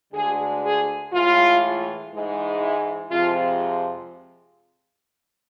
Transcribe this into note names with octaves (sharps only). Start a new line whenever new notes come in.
D2 D3 G#3 G#4
G#4
A2 E3 G#3 F4
G#2 E3 G#3
E4
F2 C3 F3 G#3 F4